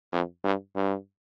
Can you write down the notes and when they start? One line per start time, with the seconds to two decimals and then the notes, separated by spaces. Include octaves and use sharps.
0.12 F2
0.44 G2
0.76 G2